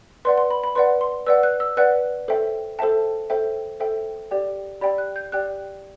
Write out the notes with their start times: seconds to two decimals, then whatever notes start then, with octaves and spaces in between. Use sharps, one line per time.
0.25 B4 D5 F#5 C6
0.38 C6
0.51 B5
0.64 B5
0.75 B4 D5 F#5 C6
1.01 C6
1.26 B4 D5 F#5 E6
1.43 F#6
1.60 E6
1.77 B4 D5 F#5 F#6
2.28 A4 C5 E5 G5
2.79 A4 C5 E5 G5 A5
3.30 A4 C5 E5 G5
3.80 A4 C5 E5 G5
4.31 G4 D5 G5
4.81 G4 D5 G5 B5
4.98 F#6
5.16 G6
5.32 G4 D5 G5 F#6